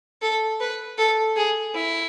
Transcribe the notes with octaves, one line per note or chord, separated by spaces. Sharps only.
A4
B4
A4
G#4
E4